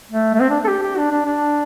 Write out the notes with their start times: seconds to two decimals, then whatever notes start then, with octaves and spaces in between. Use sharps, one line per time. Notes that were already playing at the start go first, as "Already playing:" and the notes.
0.11 A3
0.34 A3
0.40 C4
0.49 D4
0.64 A4
0.68 G4
0.83 G4
0.97 D4
1.11 D4
1.25 D4